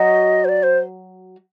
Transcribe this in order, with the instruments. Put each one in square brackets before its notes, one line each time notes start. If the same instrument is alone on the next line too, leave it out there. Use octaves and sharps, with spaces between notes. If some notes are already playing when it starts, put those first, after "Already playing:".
Already playing: [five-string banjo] F#3 F#4 [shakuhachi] D#5
[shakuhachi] C5
D5
C5